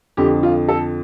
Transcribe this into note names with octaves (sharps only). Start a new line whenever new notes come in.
F2 D3 F3 G4
F4
A4